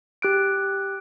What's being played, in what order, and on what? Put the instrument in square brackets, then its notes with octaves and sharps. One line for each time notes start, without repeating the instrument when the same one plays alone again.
[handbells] G4 F#6 D7